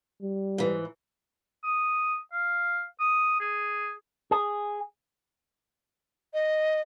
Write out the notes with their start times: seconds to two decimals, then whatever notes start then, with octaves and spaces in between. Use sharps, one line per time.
0.22 G3
0.58 G#2 E3
1.64 D#6
2.33 F5
3.00 D#6
3.40 G#4
4.31 G#4
6.34 D#5